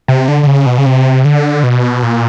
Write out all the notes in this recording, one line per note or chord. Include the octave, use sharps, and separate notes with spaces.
C3
D3
D3
C#3
B2
C#3
C3
D3
B2
A#2